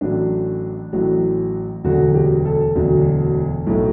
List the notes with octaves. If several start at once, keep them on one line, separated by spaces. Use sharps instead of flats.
A1 A2 F#3 D4
A1 A2 F#3
E1 D2 D3 F#3 F#4
G4
A4
E1 D2 D3 F#3
B1 A2 F#3 A3